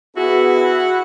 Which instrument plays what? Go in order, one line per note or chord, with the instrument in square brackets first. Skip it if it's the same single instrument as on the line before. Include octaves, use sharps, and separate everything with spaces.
[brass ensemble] B3 G#4 [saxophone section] E4 F#4